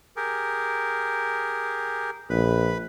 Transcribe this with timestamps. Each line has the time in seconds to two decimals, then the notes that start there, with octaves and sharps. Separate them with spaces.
0.16 G4 G#4 A#4
2.30 A#1 B4 B5